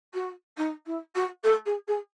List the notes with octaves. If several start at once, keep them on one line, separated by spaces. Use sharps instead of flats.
F#4
D#4
E4
F#4
A4
G#4
G#4